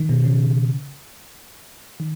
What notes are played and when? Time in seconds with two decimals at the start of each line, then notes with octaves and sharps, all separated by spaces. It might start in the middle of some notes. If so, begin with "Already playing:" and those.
Already playing: D#3
0.09 B2
0.24 C#3
2.00 D#3